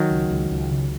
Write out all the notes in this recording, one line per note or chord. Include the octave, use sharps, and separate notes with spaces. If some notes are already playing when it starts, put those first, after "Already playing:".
Already playing: D#3 F#3
C#2
C#2
C#2
C#3